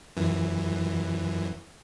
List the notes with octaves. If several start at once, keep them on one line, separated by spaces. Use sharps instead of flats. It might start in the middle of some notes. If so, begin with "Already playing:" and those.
F#2 E3